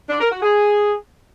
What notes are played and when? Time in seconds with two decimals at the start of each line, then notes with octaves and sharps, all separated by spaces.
0.10 D4
0.21 A#4
0.32 F#4
0.43 G#4